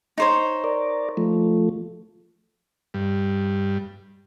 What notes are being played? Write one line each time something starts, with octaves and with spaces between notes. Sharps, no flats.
D#4 C5 C#5
A#4 D5
F3 A3
G2